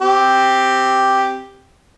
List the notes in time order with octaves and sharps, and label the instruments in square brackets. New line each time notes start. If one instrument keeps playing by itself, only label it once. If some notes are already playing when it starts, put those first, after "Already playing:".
[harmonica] C4 G4